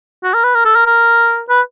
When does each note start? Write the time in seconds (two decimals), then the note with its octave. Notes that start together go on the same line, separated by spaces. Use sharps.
0.23 F#4
0.34 A#4
0.44 B4
0.55 A#4
0.65 A4
0.76 A#4
0.86 A#4
1.49 B4